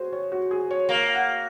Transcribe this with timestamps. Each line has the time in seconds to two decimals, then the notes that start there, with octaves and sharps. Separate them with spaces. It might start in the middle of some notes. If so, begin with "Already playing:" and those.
Already playing: F#4 G#4 C5
0.13 C#5
0.32 F#4
0.51 G#4
0.71 C#5
0.88 A#3 C#5
1.15 F#5